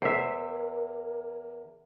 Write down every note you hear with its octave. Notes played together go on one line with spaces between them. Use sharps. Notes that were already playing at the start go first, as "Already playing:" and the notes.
E2 A#4 C5 E5